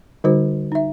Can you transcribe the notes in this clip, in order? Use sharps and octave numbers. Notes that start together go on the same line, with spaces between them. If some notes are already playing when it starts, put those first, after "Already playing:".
D3 G3 D#4 F#4 C5
D#4 E5